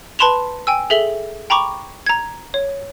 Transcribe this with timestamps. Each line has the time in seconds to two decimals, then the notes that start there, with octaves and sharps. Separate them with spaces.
0.19 B4 A5 B5 C6 E7 F7
0.67 G5 G#5 E6
0.90 G#4 A4 E5 F#7 G7
1.50 G5 A#5 B5 C#6 D6
2.06 A#5 G#6
2.54 C#5